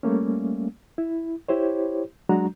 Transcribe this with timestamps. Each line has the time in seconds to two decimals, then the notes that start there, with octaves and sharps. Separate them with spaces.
0.03 G3 A3 A#3 C#4
0.98 E4
1.49 E4 G4 C5 C#5
2.29 F#3 G#3 D4 F#4 A#5